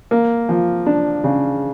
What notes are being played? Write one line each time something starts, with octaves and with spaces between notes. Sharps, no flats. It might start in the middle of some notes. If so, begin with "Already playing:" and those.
A#3
F3
D4
C#3